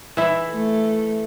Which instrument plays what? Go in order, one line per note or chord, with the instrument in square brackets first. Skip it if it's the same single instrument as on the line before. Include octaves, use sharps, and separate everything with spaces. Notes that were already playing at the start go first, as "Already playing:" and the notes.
[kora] E3 E4
[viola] A3